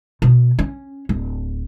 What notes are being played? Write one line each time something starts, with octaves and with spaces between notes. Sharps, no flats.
B2
C#4
D1